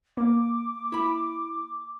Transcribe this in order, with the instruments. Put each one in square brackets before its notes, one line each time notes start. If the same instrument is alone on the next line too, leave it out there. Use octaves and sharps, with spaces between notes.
[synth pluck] A#3 [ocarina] D6
[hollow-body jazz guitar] E4 B5